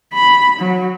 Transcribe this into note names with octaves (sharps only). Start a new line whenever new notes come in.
B5
F#3